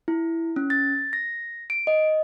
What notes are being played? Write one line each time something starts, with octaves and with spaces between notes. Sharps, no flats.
E4
C#4
A6
A#6
D7
D#5